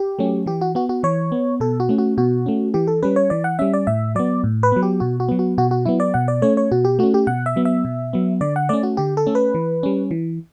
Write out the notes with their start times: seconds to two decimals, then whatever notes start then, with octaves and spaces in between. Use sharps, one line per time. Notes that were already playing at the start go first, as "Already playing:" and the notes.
Already playing: G4
0.19 F#3 A3 C#4
0.46 E3 G4
0.61 F#4
0.75 B3 F#4
0.89 F#4
1.03 E3 C#5
1.32 B3
1.60 B2 A4
1.80 F#4
1.89 A3 C#4
1.98 F#4
2.18 B2 F#4
2.46 A3 C#4
2.74 E3 G4
2.87 A4
3.03 G3 C#4 B4
3.16 C#5
3.30 E3 D5
3.44 F#5
3.59 G3 C#4 E5
3.73 D5
3.87 A2 E5
4.15 F#3 B3 D5
4.44 A2
4.63 B4
4.72 F#3 B3
4.82 G4
5.00 B2 F#4
5.20 F#4
5.29 F#3 B3
5.39 F#4
5.58 B2 F#4
5.71 F#4
5.85 F#3 B3 E4
6.00 D5
6.14 B2 F#5
6.28 D5
6.42 A3 C#4 C#5
6.57 C#5
6.72 B2 F#4
6.85 G4
6.99 A3 C#4 F#4
7.14 G4
7.27 B2 F#5
7.46 E5
7.56 F#3 B3
7.65 E5
7.85 B2
8.13 F#3 B3
8.41 D3 D5
8.56 F#5
8.69 A3 C#4 D5
8.83 F#4
8.97 D3 G4
9.17 A4
9.27 A3 C#4
9.35 B4
9.55 E3
9.83 G3 C#4
10.11 E3